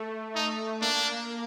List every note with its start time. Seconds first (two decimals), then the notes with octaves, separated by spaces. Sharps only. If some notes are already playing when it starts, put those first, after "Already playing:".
Already playing: A3
0.35 D#4
0.81 A#3 D4